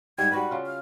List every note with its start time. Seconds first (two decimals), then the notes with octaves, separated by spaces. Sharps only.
0.18 G#2 G3 G#6
0.31 G3 F#4 B4 B5
0.51 C#3 F4
0.66 F6